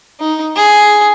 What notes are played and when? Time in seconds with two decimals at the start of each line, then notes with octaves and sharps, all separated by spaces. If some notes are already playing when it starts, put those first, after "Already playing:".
0.20 D#4
0.55 G#4